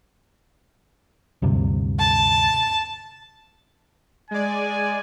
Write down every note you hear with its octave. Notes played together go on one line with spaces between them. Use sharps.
D2 G2 C3
A5
G#3 D5 G#5